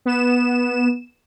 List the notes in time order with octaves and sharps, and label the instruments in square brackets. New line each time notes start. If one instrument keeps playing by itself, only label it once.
[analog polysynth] B3 E7